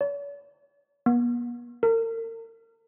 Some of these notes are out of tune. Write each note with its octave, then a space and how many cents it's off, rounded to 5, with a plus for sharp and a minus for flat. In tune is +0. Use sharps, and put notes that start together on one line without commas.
C#5 +45
B3 -45
A#4 -40